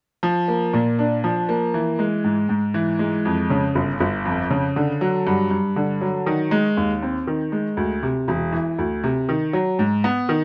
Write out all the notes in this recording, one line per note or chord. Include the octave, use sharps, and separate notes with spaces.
F3
A#3
A#2
D4
F3
A#3
E3
G#3
G#2
G#2
E3
G#3
F2
C#3
G1
G1
F2
C#3
D3
F#3
G2
G2
D3
F#3
D#3
G#3
D#2
C4
D#3
G#3
D2
C3
E1
E3
D2
C3
D#3
F#3
G#2
B3
D#3